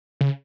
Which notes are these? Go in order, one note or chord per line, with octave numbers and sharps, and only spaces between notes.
C#3